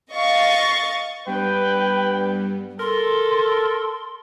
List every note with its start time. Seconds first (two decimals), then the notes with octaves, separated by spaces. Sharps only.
0.12 D#5 F5 C#6 A6
1.26 G2 G3 B3 B4 G5
2.80 A4 A#4 C6